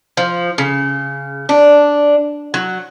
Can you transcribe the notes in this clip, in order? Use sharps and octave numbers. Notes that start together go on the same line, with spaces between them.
F3
C#3
D4
F#3